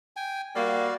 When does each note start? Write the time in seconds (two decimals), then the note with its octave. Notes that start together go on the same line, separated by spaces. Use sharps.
0.16 G5 G#5
0.56 G3 A#3 F#4 D5 F5